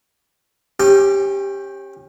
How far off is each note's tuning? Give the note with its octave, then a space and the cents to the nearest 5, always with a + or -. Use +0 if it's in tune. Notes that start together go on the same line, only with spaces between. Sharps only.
C#4 -30 G4 +5